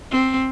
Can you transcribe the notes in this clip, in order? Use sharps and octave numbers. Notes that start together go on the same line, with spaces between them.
C4